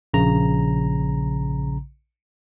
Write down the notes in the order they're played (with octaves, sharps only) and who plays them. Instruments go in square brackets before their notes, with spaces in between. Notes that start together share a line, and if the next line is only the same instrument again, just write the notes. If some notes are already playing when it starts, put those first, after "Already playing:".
[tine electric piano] A#1 C#3 A#5